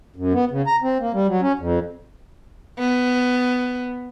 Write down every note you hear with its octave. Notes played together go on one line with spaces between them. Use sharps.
F#2
B3
C#3
A#5
C4
A#3
G3
F#3
C#4
F2
B3